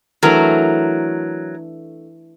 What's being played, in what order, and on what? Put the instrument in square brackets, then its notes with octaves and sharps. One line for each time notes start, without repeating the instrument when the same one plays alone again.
[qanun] E3 A3 D4 [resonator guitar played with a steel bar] F#3 A#4